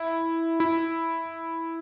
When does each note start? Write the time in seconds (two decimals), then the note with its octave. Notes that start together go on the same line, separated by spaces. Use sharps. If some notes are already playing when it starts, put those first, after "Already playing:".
Already playing: E4
0.60 E4